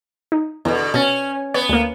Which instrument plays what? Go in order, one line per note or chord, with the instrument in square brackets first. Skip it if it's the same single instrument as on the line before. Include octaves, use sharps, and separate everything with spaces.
[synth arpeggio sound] D#4
[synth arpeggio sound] E2 [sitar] B2 D3
[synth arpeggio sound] B2 A6 [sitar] C#4
[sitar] B3 [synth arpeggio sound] C#5
[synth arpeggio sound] D2 A#3